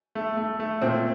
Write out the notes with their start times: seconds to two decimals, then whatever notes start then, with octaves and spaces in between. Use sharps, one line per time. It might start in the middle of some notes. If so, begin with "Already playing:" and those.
0.15 A3
0.37 A3
0.60 A3
0.81 A#2 C4